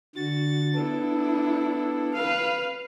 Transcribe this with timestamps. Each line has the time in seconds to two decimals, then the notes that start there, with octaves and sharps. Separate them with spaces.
0.16 D3 F#4 A6
0.75 B3 D4 E4 A4
2.15 B4 F5